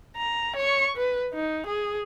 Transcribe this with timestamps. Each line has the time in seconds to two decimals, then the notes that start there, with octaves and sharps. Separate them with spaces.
0.17 A#5
0.56 C#5 C#6
0.97 B4
1.34 D#4
1.66 G#4